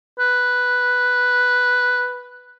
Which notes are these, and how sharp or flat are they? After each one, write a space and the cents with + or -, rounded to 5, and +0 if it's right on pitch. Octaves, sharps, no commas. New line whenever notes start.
B4 +0